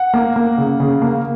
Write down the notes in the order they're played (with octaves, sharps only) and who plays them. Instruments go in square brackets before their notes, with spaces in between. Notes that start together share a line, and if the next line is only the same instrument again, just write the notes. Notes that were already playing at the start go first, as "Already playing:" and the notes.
Already playing: [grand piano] F#5
A#3
A#3
C#3
C#3
A#3